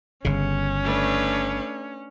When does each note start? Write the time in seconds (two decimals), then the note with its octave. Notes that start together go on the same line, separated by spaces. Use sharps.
0.25 G1 C#3 C#4
0.83 A3 D4 B4